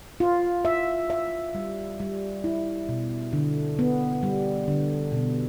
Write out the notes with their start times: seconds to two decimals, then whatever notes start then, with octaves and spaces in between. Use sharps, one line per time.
0.20 F4
0.65 E5
1.10 E5
1.55 G3
2.00 G3
2.44 E4
2.89 B2
3.33 D3
3.79 B3
4.23 G3
4.68 D3
5.12 B2